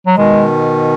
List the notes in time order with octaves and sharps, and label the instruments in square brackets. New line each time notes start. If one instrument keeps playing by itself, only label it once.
[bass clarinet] F#3
[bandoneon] B2 D#3 [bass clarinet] G#3